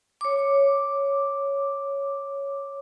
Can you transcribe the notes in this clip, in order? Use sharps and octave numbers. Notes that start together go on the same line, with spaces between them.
C#5 D6